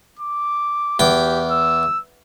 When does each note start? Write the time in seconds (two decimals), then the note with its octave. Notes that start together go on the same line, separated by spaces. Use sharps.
0.19 D6
0.99 E2 G4 G5 D6
1.51 E6